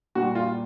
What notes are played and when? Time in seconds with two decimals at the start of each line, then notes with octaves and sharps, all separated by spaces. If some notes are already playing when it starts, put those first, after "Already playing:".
0.15 A#2 G3 F#4
0.35 F4